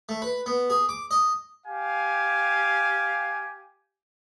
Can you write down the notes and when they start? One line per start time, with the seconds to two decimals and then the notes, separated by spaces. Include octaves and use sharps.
0.09 A3
0.22 B4
0.46 B3
0.70 G#4
0.89 D6
1.11 D#5
1.67 G4 F5 G#5